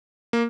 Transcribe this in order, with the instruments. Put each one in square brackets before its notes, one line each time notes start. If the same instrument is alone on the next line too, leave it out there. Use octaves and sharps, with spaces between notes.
[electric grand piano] A#3